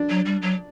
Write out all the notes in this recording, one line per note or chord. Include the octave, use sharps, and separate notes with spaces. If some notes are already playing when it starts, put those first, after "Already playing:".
Already playing: D4
F#3
G3
F#3